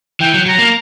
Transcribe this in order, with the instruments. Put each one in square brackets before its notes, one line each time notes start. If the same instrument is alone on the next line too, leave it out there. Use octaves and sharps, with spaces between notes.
[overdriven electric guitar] E3 [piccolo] G5
[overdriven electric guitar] F#3
[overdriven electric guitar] F#3 [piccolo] A#5
[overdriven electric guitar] A#3